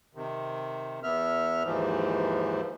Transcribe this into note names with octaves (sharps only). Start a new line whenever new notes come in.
C3 D#3
E2 B3 E5 F6
D#2 G#2 E3 F3